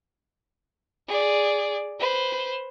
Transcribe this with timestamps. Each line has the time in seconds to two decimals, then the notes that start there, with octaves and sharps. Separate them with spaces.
1.07 G#4 D5
1.99 B4 C5